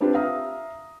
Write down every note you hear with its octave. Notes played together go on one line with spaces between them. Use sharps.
C4 D4 F4 G4 B4 C5
E5 F5 A#5 D#6